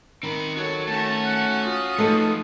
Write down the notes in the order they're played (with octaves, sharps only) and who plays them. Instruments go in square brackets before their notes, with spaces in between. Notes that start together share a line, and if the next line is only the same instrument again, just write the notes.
[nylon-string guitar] D#3 [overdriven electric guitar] C4 B5
[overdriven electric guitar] F#4 C#5 [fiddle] A4
[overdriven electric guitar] A3 [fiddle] C#4 F#4 [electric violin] A5
[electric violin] F#5
F4 D#6
[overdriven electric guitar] F3 B3 [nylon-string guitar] A3 D#4 A4